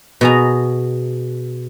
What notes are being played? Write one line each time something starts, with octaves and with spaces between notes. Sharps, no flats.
B2 G#4 A#5